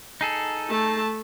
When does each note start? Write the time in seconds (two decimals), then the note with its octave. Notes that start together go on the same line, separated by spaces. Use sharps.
0.21 D#4 G#4 A4
0.69 A3 A5